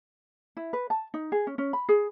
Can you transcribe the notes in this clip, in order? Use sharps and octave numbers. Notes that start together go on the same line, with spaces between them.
E4
B4
A5
D#4
G#4
C#4
C#4
B5
G#4